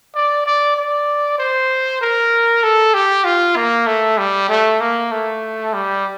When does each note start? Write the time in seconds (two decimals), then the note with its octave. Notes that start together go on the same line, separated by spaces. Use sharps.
0.15 D5
0.46 D5
0.77 D5
1.39 C5
2.02 A#4
2.63 A4
2.94 G4
3.25 F4
3.57 A#3
3.87 A3
4.18 G3
4.49 A3
4.81 A#3
5.12 A3
5.73 G3